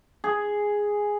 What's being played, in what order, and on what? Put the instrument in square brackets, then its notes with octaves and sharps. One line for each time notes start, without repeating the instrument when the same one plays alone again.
[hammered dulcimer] G#4